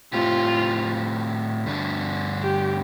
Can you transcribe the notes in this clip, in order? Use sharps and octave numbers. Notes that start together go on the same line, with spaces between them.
A2 A3 C4 F4 G4
G2 D3 A3 D4
G4